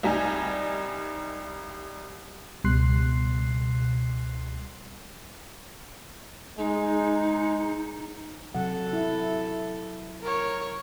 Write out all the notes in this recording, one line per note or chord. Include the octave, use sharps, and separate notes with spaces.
C2 G3 D#4 G#5
C#2 B2 G3 C6 F#6 C7
G#3 D#4
C3 F#3 A4 F#5
E4
A#4 C#5